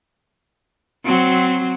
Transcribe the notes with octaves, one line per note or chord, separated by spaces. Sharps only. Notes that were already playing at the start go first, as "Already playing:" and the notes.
F#3 C4